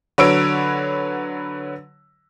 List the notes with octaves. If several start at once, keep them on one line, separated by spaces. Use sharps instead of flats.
D3 F#3 B4 C#5 E6 D7